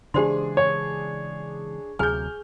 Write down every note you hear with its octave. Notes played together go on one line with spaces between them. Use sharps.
C#3 E3 G#3 D4 G4 G#4 C5 C6
C#5
D2 C3 F#3 G#4 G#5 F6 G6